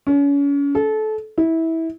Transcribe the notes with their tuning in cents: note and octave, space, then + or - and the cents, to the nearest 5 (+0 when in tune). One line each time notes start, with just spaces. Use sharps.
C#4 +35
A4 -25
E4 -20